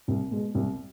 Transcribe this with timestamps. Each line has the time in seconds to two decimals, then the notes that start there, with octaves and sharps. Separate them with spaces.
0.08 C2
0.31 B2 G#3
0.55 C2